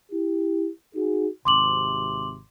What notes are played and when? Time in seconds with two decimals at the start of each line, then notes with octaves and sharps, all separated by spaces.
0.11 E4 G4
0.95 D#4 F#4 G#4
1.45 G#1 C3 C6 D6 F#7